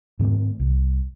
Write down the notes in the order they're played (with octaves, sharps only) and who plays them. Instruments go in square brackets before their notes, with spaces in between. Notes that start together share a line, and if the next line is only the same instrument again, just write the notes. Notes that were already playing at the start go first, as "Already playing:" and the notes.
[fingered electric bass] G#2 D#3 A3 C4
C2